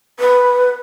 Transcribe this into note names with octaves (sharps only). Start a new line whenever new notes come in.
B4